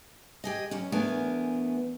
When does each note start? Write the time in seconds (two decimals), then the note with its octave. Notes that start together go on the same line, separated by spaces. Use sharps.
0.44 G4 G#4 D#5
0.71 F#2 C#4
0.92 E2 A3 B3 D4 A#4 G#5